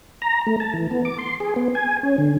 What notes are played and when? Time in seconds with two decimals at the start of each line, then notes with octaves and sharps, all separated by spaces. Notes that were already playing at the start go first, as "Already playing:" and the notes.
0.22 A#5
0.47 A3
0.60 A5
0.74 E3
0.91 B3
1.05 D6
1.18 C6
1.40 G#4
1.56 B3
1.75 G#5
2.03 C#4
2.18 D3